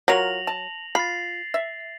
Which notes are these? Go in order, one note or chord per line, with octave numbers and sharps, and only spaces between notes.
F#3 F4 A#4 C#5 A#6 F7 F#7
A5
F4 B5 A6 C7
E5